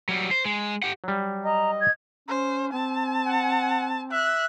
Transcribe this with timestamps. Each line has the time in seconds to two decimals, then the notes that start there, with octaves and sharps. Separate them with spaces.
0.09 F#3 G3
0.31 C5
0.45 G#3
0.83 G4 F#5
1.04 F#3 G3
1.45 D#5 A#5
1.81 G#6
2.28 C#4 C5
2.73 C4 A5
3.28 F#5
4.12 E5 F#6